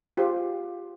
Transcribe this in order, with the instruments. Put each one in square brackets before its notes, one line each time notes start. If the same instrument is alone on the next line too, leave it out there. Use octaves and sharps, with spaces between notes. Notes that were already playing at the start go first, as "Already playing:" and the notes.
[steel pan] F4 G4 G#4 C5